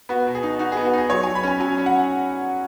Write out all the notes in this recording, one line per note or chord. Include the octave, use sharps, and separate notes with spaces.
B3 F#4
B2
G#4
D#4
D#4 F#4
B3 G#4
F#4
D#4 G#4
F#3 C#5
F#3 G#5
B5
C#4 G#5
F#3 G#5
C#4
F#5